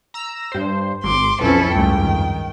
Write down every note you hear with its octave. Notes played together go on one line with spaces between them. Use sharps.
A#5 E6
G2 C5
G#1 C6 D6
B1 F2 F3 C#4 E4 A4 B4
C#2 G2 A3 G5
D#3